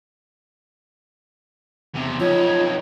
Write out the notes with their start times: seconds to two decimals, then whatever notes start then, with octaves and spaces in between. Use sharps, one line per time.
1.94 E2 C3
2.20 F2 D#4 F4 C#5